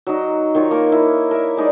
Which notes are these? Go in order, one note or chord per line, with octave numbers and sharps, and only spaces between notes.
F#3 D#4
D#3 F4 C#5 G5
A#3 A#4
E4
A#4 E5
G#3 D#4 G#4 D5